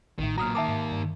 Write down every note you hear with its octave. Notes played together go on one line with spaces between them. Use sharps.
A1 A2 D#3
A#2 F#3 A#5 D#6 F6
D#3 A#3 E5 A5 D6
G#2
G2